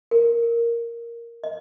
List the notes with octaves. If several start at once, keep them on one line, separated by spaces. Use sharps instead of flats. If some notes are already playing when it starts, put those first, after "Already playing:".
A#4
D#5